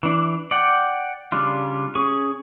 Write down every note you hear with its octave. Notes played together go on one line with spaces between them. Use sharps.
E3 D4
D5 F#5 G5
C#3 G3 D4 F4
C#4 G#4 C#6